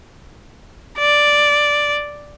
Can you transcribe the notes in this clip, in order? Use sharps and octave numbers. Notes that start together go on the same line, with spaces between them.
D5